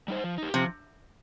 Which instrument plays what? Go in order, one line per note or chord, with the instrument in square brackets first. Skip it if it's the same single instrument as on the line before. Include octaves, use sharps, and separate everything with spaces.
[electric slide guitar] G3 D#4 C5
F3
D#4 G4
[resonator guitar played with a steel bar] C3 [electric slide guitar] F3